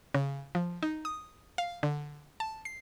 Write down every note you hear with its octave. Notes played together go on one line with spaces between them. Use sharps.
C#3
F3
D#4
D#6
F5
D3
A5
C7